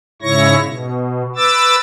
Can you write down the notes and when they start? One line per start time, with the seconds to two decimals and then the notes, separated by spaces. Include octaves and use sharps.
0.22 G#2 C#3 E4 C#5 C#6 A#6
0.63 B2
1.36 B4 D6 E6 A6